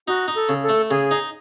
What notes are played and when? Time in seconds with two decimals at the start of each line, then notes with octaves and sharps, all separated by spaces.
0.07 D#4 F#4
0.28 D#4
0.35 A4
0.49 C#3
0.63 A4
0.69 A3
0.90 C#3 G#4
1.11 D#4